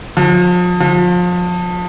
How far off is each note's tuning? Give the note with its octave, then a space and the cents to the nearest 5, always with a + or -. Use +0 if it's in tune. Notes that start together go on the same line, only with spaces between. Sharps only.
F3 +35
F3 +30